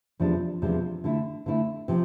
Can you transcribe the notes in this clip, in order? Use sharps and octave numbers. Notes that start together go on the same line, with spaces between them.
E2 C3 F3 G#3 D4
E2 C3 F3 G#3 D4
D3 A3 E4
D3 A3 E4
C3 F3